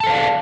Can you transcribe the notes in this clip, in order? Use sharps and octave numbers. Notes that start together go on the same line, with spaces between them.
A4 C5 D5 F5 A5